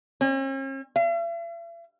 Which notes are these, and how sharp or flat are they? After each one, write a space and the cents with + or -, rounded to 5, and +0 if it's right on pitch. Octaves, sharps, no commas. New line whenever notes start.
C#4 -45
E5 +45